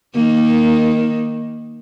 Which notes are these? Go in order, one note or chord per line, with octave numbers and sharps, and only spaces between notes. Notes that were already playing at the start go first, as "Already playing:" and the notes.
D#3 A#3